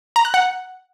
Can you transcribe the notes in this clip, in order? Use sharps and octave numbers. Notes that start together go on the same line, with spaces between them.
A#5
F#6
F#5